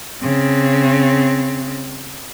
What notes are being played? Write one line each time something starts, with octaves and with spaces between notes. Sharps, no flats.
C#3 C4